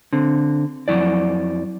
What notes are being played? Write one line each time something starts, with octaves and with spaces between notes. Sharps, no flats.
D3 C4
F2 C3 F#3 E4 D5